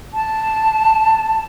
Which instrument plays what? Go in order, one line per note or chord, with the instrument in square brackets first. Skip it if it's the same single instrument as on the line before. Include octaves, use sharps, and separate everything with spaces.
[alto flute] A5